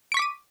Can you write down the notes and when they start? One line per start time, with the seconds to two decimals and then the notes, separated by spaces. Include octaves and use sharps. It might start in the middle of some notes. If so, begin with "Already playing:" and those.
0.12 D7
0.14 C#6
0.17 B6
0.19 D6
0.22 D#7